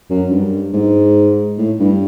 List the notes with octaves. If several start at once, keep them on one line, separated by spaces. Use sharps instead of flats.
F#2
G2
G#2
A2
G2